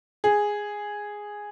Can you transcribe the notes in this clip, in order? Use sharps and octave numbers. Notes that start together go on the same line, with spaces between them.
G#4